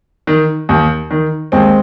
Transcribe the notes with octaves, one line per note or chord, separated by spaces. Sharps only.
D#3
D#2
D#3
D#2 G#3 C4